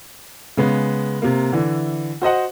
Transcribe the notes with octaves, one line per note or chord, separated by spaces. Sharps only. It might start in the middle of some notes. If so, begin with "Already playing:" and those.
C#3 G#3 B3
C3 A#3
D3 E3
F#4 C5 D#5 F#5